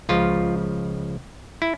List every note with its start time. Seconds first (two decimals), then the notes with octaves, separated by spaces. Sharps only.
0.09 C#2 C#3 F3 F4
1.62 E4